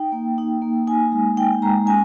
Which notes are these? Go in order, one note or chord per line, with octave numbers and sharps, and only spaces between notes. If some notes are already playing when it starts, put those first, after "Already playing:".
Already playing: D#4 G5
A#3
D#4
A#3
D#4 G#5
G#3
D#4 G5
G#3 A#5
C#4 G#5